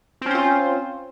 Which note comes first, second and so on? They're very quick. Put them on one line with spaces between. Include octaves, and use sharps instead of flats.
C4 C#4 C5 F4